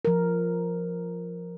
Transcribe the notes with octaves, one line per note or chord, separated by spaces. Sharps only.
F3 A#4